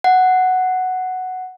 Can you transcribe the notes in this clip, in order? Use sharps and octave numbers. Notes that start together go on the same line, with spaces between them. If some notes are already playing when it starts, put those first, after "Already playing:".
F#5